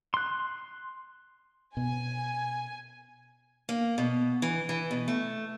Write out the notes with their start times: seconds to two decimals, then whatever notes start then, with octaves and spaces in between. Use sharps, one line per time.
0.14 C6 F#6
1.77 B2 G#5
3.69 A#3
3.98 B2
4.42 E3
4.69 E3
4.91 B2
5.08 A3